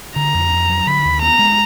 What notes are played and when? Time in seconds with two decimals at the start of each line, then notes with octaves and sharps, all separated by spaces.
0.16 D3 A#5
0.34 F2
0.52 F2
0.70 F#3
0.87 D3 B5
1.05 D#2
1.21 B3 A#5
1.39 G#3